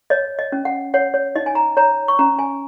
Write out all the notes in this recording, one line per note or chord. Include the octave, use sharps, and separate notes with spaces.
C#5 D#5
D#5
C#4
F#5
C#5 F#5
C#5
D#4 D#5
G#5
A#5
C#5 A#5
C#6
C#4 A#5
G#5